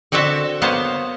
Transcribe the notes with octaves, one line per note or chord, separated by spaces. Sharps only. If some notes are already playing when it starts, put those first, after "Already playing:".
D3 C4 F#4 A4 E5 A5
A#3 B3 C5 C#5 A5